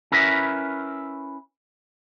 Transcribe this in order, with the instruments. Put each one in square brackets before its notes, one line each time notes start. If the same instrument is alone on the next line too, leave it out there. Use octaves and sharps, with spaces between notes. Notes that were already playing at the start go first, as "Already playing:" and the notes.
[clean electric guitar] C#4 E4 A#4 B4 E5